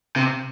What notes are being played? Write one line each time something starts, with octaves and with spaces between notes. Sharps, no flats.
C3